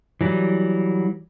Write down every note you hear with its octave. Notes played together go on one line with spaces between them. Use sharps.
E3 F#3 G3